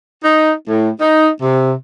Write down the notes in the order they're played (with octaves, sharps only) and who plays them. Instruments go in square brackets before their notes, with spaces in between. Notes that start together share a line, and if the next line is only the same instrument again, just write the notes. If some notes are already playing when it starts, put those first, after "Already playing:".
[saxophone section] D#4
A2
D#4
C3